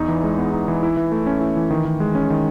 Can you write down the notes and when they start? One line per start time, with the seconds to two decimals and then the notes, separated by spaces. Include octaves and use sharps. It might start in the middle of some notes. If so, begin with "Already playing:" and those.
Already playing: E2 D#4
0.08 E3
0.24 G#3
0.38 B3
0.53 D#4
0.68 E3
0.83 E4
0.97 E3
1.12 A3
1.26 C#4
1.41 E4
1.56 E3
1.71 D#3
1.85 D#3
2.00 G#3
2.15 C#4
2.30 D#3